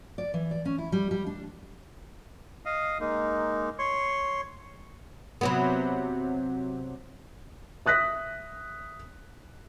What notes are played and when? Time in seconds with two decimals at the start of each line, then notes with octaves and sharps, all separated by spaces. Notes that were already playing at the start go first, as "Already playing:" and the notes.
0.18 D5
0.34 E3
0.51 D5
0.65 C#4
0.78 E4
0.92 G3
1.11 G3
1.26 D4
2.66 D#5 F5 D#6
3.00 G#3 A#3 D#4
3.79 C#5 C6 C#6
5.41 C3 F#3 B3
7.86 E5 D#6 F#6 A#6 B6